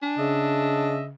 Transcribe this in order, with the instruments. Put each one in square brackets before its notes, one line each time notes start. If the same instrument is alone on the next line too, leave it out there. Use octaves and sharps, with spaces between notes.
[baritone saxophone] D4 [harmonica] G#5
[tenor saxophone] C#3 [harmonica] D#5 E5